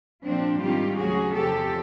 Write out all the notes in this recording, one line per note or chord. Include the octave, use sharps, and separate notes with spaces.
A#2 F3 C4 D4
G#2 D#3 G3 F4 G4
D2 C#3 F#3 F#4 G#4
E2 C3 F3 G4 A4